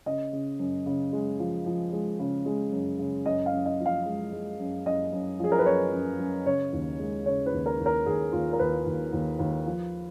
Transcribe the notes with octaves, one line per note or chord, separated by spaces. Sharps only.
C#3 D#5
C#3
F#2
C#3
G#3
F3
F3
G#3
C#3
G#3
F#2
C#3
F#2 D#5
F5
F#2
D#5
F3
F5
G#3
G#3
F#2
F#2 D#5
F#2
F3 G#4
A#4
B4
F#2 C#5
F#2
F#2
C#3 C#5
D#2
G#3
C#3 C#5
B4
D#2
A#4
D#2
A#4
D#2 G#4
D#2 F4
A#4
D#2 B4
D#2
D#2
D#2
F3